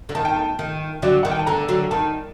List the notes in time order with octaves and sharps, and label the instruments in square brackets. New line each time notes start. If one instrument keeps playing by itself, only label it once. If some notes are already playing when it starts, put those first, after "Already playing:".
[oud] D3
[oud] D#3 [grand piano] A5
[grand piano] G5
A5
[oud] D#3
[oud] D3 F#3 [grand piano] D5
[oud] D#3 [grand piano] F#5
[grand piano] G5
A5
[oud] D3 [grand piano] A#5
[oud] D3 F#3
[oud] D#3 [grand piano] A5